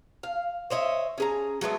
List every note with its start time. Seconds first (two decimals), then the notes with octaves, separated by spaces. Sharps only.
0.23 F5
0.70 C5 C#5 D#5 E5
1.18 C#4 G#4 A#5
1.61 F#3 G#3 A3 B3